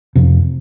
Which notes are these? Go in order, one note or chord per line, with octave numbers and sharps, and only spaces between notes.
F1 F2 C3